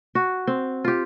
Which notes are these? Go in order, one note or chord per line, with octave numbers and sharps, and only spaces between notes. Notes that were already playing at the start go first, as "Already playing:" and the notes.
F#4
C4
F4 G4